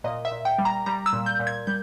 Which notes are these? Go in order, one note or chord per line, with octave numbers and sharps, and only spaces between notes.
A#2 D#5
E5
A#2
G5
G3
A#5
G3 A#5
E6
A#2
G6
A#2
G#6
G3 G6